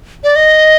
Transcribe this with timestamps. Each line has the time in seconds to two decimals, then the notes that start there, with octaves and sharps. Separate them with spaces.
0.24 D5
0.36 D#5